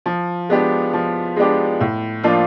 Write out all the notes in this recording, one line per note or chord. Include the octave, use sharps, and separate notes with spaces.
F3
G#3 B3 D4 G4
F3
G#3 B3 D4 G4
A2
F3 A#3 D4 F4